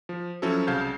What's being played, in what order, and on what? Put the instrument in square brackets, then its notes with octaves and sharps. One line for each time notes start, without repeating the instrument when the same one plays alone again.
[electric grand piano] F3
F3 F#3 C#4 E4 F#4 A4
C2 C#3 F5 A5 G6 G#6